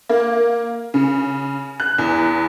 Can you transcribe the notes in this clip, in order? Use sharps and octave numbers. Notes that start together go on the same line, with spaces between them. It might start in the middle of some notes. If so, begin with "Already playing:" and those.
A#3
C#3
F#6
E2